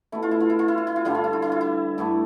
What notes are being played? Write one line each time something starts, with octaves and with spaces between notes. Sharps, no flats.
B2 A3 E4
F4
E4
F4
E4
F4
E4
F4
E4
F4
G2 D3 G3 E4
F4
E4
F4
E4
F4
E4
G2 D3 A3 E4